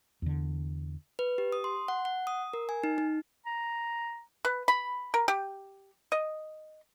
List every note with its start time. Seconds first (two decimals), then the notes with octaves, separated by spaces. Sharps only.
0.22 E2 D3
1.19 B4
1.38 G4
1.52 D#6
1.64 C6
1.88 F#5
2.05 F#5
2.27 D#6
2.53 A#4
2.69 G#5
2.84 D#4
2.98 D#4
3.46 A#5
4.45 B4
4.68 B5
5.14 A#4
5.28 G4
6.12 D#5